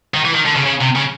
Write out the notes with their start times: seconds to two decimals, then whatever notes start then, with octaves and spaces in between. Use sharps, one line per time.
0.14 D#3
0.25 E3
0.34 D#3
0.46 D3
0.55 C#3
0.66 C#3
0.81 C3
0.96 C#3